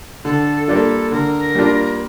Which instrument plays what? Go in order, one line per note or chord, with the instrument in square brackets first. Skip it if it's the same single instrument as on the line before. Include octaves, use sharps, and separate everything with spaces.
[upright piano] D3 [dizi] A4
[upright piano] G3 A#3 D4 F4 [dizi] A4
[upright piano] D3 [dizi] A#4
[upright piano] G3 A#3 D4 F4